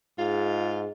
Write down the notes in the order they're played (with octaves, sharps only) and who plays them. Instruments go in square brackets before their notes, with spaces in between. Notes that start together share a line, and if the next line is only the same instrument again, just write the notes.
[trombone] G#2 [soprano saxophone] F4 [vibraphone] G#4 D#5